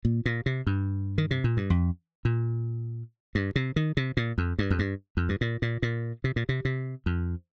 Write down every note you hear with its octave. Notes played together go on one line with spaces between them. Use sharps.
A#2
A#2
C3
G2
D#3
C3
A#2
G2
F2
A#2
G2
C3
D#3
C3
A#2
F2
G2
F2
G2
F2
G2
A#2
A#2
A#2
C3
A#2
C3
C3
F2